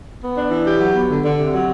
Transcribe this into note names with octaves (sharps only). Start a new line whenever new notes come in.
B3
D4
E3
G4
F#3
B3
D3
D3
C3
F#3